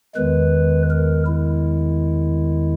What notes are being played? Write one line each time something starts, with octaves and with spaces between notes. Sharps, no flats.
E2 D#3 G#3 B4
A#4
E4